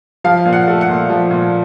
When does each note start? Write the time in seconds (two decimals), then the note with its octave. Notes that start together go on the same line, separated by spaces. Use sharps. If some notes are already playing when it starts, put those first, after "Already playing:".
0.24 F3 F5
0.45 A#2
0.53 F#5
0.67 A3
0.81 F#5
0.89 A#2
1.09 F3
1.31 A#2